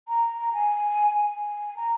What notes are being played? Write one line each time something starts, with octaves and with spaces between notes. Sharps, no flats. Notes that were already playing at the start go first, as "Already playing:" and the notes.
A#5
A#5
G#5
G#5
A#5